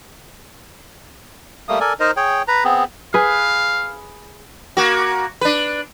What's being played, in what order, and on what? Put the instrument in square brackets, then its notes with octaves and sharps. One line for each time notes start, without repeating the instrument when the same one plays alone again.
[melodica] G3 A3 A#3 D#6
A4 A#4 D5 G#5
D#4 A#4 C5 D#5
G#4 C#5 G5
B4 A#5
B3 C4 G#4
[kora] G#4 B4 [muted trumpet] F5
[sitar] A#3 F#4
D4 B4